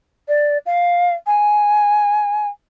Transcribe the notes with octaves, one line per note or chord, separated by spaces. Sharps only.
D5
F5
G#5